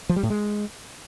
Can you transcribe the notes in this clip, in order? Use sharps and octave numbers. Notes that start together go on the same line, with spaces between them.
F3
G3
A2
G#3